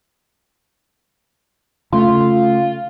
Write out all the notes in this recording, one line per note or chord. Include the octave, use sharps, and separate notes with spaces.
C#3 A3 F4